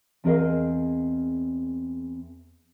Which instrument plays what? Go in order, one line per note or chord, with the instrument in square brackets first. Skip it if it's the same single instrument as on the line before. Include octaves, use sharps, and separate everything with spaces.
[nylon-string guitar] E2 C4 G#4 A#4 D#5 F5